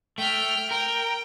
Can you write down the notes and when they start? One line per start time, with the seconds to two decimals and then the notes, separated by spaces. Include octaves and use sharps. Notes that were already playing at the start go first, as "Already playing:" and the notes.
0.18 A3 G5 F6
0.71 A#4 G5